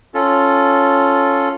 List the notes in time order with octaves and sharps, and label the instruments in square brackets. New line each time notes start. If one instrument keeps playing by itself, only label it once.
[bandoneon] C#4 F4 A4